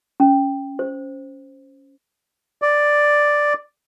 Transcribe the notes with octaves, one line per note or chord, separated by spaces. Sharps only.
C#4
C5
D5